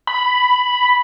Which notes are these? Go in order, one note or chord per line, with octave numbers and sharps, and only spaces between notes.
B5